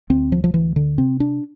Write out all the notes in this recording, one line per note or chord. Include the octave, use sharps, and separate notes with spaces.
D2 C4
F3
F3
D2 E3
D3
C3 C4
D4